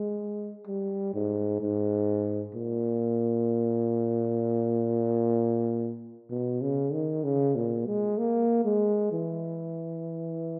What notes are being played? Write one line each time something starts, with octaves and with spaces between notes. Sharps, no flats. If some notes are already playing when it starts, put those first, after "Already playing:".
Already playing: G#3
G3
G#2
G#2
A#2
B2
C#3
D#3
C#3
A#2
G#3
A#3
G#3
E3